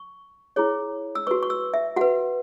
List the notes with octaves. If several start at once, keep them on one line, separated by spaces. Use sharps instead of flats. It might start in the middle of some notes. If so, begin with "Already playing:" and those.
Already playing: C#6
E4 G#4 C#5
E6
F#4 B4 C#6
C#6
E6
E5
F#4 B4 F#5